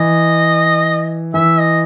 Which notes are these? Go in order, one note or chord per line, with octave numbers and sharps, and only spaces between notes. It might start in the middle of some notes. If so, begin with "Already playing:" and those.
Already playing: E3 D#5
E3 E5
D#5